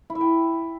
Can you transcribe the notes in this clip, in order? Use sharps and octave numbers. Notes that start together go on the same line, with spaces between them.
E4
E5
G5